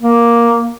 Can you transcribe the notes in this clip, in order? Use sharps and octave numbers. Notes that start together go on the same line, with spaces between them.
A#3